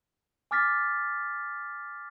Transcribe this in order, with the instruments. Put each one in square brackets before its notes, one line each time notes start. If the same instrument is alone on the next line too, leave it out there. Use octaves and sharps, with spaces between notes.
[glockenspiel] G#5 D6 F6 A6 B6